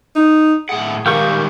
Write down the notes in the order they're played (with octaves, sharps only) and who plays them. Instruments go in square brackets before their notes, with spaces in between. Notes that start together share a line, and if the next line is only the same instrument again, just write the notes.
[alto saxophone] D#4
[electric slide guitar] A2 F#5 [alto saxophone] G#4
[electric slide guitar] D#3 G3 G#3 [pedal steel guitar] G4 A#4 C#6 [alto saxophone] F5